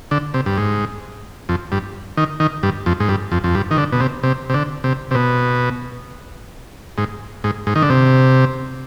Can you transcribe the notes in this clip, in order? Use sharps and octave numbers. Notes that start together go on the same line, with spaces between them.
D3
C3
G2
G#2
F2
G2
D#3
D#3
G2
F2
G#2
G2
F2
F2
G2
D#3
D3
B2
C3
C3
C3
D3
C3
C3
B2
G#2
G#2
G#2
D#3
D3
C3